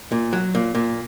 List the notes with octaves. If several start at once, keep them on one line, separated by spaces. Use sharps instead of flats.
A#2
F#3
A#2
A#2